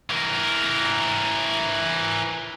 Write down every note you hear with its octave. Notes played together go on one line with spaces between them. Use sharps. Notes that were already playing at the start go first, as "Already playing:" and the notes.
E3 A#4